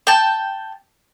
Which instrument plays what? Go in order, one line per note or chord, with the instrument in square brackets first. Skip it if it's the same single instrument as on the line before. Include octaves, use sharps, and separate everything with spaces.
[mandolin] G5 A5